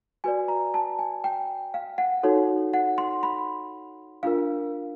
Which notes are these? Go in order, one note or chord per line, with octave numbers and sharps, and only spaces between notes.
F#4 B4 D5 G#5
A#5
A5
G#5
G5
F5
F#5
D#4 F#4 A4 C#5
F#5
C6
B5
D4 F4 A#4 F5